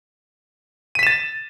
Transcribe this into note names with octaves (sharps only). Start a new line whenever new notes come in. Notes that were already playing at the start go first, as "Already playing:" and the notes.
A6 B6 D#7 E7